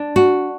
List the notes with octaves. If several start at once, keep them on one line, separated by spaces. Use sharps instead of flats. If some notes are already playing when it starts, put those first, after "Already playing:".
Already playing: D4
F#4